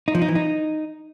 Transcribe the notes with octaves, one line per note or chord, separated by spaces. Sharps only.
D#4
F3
D#4
E3
D#4